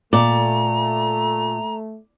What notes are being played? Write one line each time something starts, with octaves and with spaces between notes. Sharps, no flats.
A#2 A3 D5 A#5